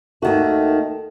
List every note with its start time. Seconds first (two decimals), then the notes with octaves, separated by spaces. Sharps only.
0.22 D#2 D#3 A3 F#4